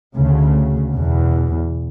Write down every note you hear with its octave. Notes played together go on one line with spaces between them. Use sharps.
D2 C#3
E2 B2